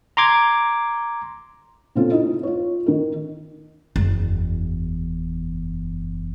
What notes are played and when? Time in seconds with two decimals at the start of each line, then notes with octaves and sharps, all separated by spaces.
0.17 A#5 C6 D6 G#6
1.95 A#2 C#3 C4 C#4 F4 A4
2.11 D#4 E4 D#5
2.43 F4 C#5
2.86 D#3 A#4
3.96 F#1 E2